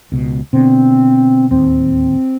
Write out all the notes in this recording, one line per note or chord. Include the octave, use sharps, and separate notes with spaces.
C#2 B2
B2 D3 C4
D1 D#2 C4